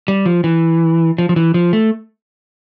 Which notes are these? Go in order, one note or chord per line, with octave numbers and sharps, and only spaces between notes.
G3
F3
E3
F3
F3
E3
F3
A3